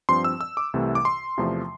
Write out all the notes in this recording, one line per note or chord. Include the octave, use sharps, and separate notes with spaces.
G2 F3 C4 C6
E6
E6
D6
C2 C3 E3 A3
D6
C6
E2 C3 F3 A3